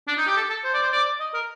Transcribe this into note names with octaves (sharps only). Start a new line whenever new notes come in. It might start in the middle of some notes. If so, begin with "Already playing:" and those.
D4
D#4
G4
A4
A4
C5
D5
C5
D5
D#5
A#4